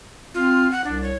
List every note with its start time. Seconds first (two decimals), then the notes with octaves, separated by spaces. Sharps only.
0.34 C4 F4
0.72 F#5
0.84 C2 D4
1.03 C#5